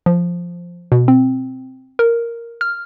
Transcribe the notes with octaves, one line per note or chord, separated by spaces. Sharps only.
F3
B2
C4
A#4
F6